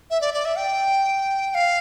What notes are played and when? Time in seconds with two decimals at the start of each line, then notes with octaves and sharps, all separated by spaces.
0.10 E5
0.21 D5
0.34 D5
0.45 E5
0.57 G5
1.50 G5
1.54 F5